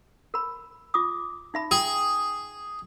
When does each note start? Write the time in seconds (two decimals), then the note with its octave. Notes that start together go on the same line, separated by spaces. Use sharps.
0.34 A#4 B5
0.94 F4 D6 D#6
1.54 D#4 E5 B5
1.71 G#4 G5